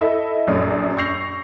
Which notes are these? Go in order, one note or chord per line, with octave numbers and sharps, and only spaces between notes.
E4 A4 D#5 E5
A#1 F#2 F#3 D5 D#6
C#6 E6 G6 A#6 C7 F7